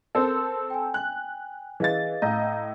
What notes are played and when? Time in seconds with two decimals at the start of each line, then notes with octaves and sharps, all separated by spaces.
0.15 C4 A4 A#4
0.70 G5 G#5
0.94 F#6
1.80 E3 G#4 D#5 F5 A6
2.22 A2 D#5 F5 A#5 G6